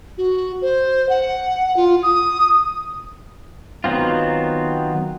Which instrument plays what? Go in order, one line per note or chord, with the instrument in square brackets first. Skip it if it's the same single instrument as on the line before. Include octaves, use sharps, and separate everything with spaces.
[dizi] F#4
C5
F#5
F4
D#6
[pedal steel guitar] D#3 F#3 B3 C4 F4